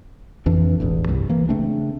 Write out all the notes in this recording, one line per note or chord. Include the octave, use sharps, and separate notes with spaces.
A1 F2 E3 D4
E1 A1 E2
C2 G2
E3 A#3
C#3 A3 C4 D4